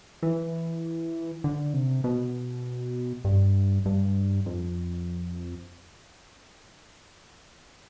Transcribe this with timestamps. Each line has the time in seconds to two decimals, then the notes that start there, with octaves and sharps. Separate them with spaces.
0.23 E3
1.44 D3
1.74 C3
2.04 B2
3.25 G2
3.86 G2
4.46 F2